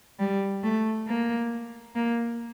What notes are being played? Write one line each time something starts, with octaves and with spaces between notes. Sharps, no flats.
G3
A3
A#3
A#3